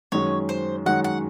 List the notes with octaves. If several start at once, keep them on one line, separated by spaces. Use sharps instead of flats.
F#2 D#3 G#3 C#4 F#4 C#5
C5
F#2 D#3 G#3 C#4 F#4 F#5
F#5